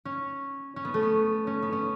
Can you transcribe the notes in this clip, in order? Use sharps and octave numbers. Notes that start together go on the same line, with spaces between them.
C#4
C#4
B3
A3
B3
C#4
B3
C#4